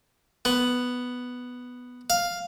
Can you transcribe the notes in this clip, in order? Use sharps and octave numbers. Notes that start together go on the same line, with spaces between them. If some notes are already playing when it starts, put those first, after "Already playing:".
B3
F5